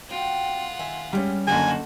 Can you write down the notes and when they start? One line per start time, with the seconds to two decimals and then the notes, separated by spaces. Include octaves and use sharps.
0.10 C4 F4 F#4 F#5 G5
0.79 D#3 E5 G#5
1.13 G2 G3 G#3 C#4
1.47 F#1 D3 F#3 A#3 D#4 F#4 A4 G#5